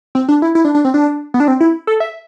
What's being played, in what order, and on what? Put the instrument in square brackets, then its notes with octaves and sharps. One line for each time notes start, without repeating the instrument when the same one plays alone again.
[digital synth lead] C4
D4
E4
E4
D4
D4
C4
D4
B3
D4
C4
E4
A4
E5